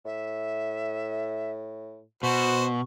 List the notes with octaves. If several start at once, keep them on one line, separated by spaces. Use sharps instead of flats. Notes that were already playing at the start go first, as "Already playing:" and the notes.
A2 E5
B2 F#4 C5 C#6